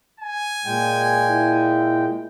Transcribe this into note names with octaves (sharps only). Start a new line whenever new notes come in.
G#5
A#2 G#3 G5
E4